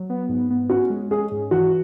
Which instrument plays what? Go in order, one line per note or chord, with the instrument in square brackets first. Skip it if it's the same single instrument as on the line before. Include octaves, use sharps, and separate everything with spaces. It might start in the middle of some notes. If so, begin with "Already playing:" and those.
Already playing: [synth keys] F#3
B3
G#2
B3
[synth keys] C#4 [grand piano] F#4
[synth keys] G#3
[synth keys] C#4 [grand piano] G#4
[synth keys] G#2
[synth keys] E3 [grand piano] F#4